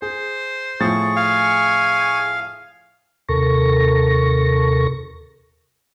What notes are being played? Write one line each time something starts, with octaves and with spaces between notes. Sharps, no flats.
G#4 C5
A2 F3 G#4 C#6 A6
F5 G#5
D#2 C3 A4 A#4 C#6 A#6